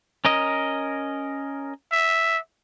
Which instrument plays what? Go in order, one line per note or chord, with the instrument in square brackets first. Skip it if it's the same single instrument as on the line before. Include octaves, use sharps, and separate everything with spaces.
[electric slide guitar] C#4 A#4 D#5
[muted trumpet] E5